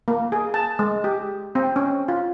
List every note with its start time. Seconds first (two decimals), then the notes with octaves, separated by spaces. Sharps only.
0.08 A#3
0.32 G#4
0.54 A5
0.79 G#3
1.04 G4
1.55 C4
1.76 C#4
2.08 F4